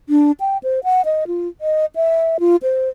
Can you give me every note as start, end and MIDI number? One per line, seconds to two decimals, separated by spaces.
0.09 0.32 62
0.40 0.58 79
0.63 0.80 72
0.84 1.02 78
1.05 1.24 75
1.27 1.48 65
1.61 1.85 75
1.96 2.37 76
2.40 2.56 65
2.63 2.89 72